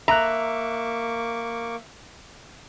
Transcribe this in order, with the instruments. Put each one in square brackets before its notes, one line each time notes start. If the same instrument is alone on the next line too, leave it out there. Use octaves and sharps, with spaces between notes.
[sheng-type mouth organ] A#3 C#6 D6 [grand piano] E5 F#6 [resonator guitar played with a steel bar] A#5